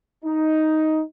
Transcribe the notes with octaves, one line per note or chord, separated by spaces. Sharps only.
D#4